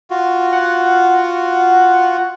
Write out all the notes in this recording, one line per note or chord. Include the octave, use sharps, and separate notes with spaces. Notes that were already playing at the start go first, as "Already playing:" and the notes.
F4 F#4
F#5